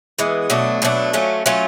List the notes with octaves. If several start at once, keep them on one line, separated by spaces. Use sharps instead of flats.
E3 G#3 B3
B2 F#3 A3 D4
B2 F#3 A3 D4
F#3 A3 C#4 F4
F#3 A3 C#4 F4